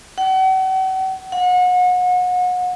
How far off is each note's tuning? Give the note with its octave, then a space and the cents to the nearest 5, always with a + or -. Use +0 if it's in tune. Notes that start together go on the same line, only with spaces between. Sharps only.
F#5 +40
F#5 -35